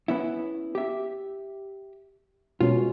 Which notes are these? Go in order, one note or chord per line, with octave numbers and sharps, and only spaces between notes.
B3 C#4 E4
G4 E5
B2 G#3 C#4 F4